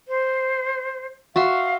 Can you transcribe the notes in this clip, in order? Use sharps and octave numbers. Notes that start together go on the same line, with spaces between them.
C5
F#4 E5 F5 C6